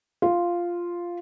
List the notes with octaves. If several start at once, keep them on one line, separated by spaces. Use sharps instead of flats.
F4